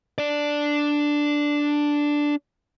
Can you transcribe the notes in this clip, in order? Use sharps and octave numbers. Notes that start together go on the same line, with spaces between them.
D4 D5